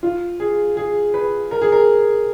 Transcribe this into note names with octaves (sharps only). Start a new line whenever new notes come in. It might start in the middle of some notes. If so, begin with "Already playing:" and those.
F4
G#4
G#4
B4
A#4
G#4
A#4